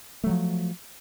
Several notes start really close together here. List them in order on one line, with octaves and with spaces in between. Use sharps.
A3 F#3 F3